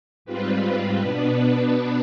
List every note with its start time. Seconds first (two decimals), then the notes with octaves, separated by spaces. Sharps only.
0.25 G#2 G3 C4 F4 B4
0.98 B2 B3 D4